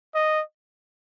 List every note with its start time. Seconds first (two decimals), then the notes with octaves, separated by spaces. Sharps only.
0.15 D#5